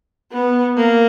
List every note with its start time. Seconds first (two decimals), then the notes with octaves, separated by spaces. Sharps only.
0.32 B3
0.77 A#3